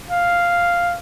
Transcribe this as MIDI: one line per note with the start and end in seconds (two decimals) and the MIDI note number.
0.11 0.99 77